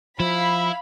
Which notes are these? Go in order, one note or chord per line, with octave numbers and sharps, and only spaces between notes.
F3 E4 F5 B5